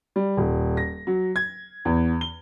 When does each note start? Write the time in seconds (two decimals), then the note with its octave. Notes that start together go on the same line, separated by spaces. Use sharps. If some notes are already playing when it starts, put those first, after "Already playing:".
0.16 G3
0.37 D#1
0.77 A#6
1.07 F#3
1.36 G#6
1.85 E2
2.21 G7